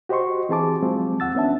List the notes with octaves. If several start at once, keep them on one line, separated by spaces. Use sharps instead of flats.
F#4 G4 C5 D#5 C6 C#6
E3 C4 G#4 A5 D6
F3 F#3 G#3 C4 F4
D#2 F#5 E6 A6
B3 C#4 D4 E5 A5